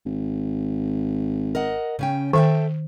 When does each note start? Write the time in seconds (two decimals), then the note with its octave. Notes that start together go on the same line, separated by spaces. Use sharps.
0.05 G#1
1.55 A#4 D#5 F#5
1.99 C#3 C#4 G5
2.33 D#3 A4 E5 G5